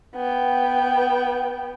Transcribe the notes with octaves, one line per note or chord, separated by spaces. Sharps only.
B3 G5